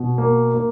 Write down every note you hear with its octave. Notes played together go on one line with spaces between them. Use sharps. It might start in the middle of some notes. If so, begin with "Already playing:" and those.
Already playing: B2
A#3
A#3